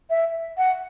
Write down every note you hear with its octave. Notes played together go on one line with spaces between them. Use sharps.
E5
F#5